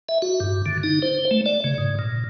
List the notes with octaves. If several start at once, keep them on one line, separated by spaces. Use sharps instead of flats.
E5
F#4
G2
D3
D#4
C5
A3
D5
C#3
G#2
A#2